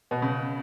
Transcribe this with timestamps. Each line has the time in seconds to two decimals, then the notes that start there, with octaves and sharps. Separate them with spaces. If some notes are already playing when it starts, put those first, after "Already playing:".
0.11 B2
0.22 C#3